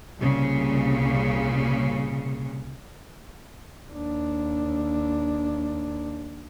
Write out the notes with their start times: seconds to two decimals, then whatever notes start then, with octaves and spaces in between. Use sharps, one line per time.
0.20 C2 A#2 C#3
3.89 D#2 D4